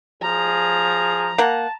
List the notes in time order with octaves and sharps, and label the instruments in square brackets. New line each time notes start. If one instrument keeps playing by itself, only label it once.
[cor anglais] F3 [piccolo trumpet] G#4 [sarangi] A#5
[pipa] A#3 F#5 [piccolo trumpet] A5